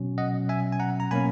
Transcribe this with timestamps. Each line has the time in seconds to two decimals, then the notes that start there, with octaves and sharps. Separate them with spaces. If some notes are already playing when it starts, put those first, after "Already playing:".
Already playing: B2 F#3 C#4
0.18 D#5 F#5
0.49 E5 G#5
0.72 G#5
0.80 F#5 A#5
1.00 A#5
1.11 B2 F#3 A#3 C#4 G#5 B5